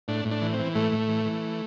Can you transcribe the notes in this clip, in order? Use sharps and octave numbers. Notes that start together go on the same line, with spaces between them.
A2 D4
A2
D4
E3
C4
E3
A2 A3
A2
E3
E3